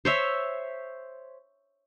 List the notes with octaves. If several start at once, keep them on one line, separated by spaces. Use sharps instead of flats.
C5 C#5 E5